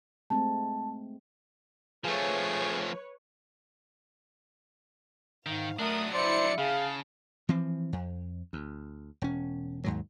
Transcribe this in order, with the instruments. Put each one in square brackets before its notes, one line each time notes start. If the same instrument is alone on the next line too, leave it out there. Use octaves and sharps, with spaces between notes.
[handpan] G#3 A3 C4 [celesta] A5
[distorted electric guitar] F3 A3 [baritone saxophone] G#4 [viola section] B4 C#5
[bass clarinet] G#2 [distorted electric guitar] D#3 [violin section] F5
[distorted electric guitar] F#3 D4 [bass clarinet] A3 [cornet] A#4 [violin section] D#6
[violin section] E4 E5 C#7 [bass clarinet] C5 [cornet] D5
[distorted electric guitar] C#3 [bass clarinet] G#4 [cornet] F5 [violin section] A5
[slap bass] E3 F3 C4
F2
D2
E1 C#4
D#2 G#2 F#3